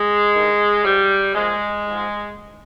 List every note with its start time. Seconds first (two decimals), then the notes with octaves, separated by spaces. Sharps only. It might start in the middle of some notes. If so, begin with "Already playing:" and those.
Already playing: G#3
0.32 G2 D#3
0.84 G#2 F3 G3
1.35 A#2 F3 G#3
1.87 G#2 F3